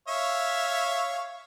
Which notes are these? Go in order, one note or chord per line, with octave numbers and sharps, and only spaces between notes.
C#5 E5 F5